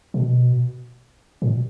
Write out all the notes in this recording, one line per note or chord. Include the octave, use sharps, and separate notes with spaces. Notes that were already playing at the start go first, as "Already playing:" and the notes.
B2
A#2